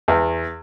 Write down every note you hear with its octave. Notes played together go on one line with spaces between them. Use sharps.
E2